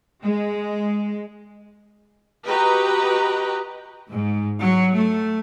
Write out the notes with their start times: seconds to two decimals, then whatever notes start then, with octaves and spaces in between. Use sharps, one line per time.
0.24 G#3
2.46 F#4 G4 B4 D#5 G5 A#5
4.10 G#2
4.60 F#3
4.96 A3